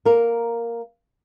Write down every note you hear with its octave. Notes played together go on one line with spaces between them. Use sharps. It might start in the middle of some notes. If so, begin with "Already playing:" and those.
A#3 A#4